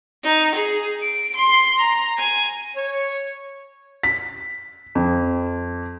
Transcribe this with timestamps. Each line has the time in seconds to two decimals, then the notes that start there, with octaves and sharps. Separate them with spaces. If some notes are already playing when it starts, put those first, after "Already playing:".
0.24 D#4
0.55 G#4
1.03 D7
1.36 C6
1.79 A#5
2.18 G#5
2.76 C#5
4.03 B6
4.95 F2